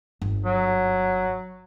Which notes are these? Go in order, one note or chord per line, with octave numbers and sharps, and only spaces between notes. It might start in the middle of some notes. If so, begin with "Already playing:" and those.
G1
F#3